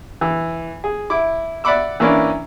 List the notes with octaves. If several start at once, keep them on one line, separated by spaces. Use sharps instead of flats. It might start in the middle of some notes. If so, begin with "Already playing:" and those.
E3
G#4
E4 D6
D5 E5 F#5 B5 D6 E6
E3 A#3 C#4 D4 E4